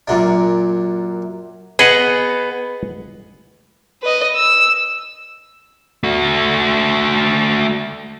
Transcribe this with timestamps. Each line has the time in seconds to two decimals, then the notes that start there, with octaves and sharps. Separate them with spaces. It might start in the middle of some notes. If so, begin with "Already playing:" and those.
0.08 F#2 A#2 D4
1.79 B3 G#4 D#5 F#5
4.02 B4 D#5
4.35 E6
6.04 A3 F#4